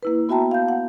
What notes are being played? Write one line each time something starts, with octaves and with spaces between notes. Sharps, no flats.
A#3 E4 B4
B3 F#4 E5 G5 A5 A#5
F5 G6
F#5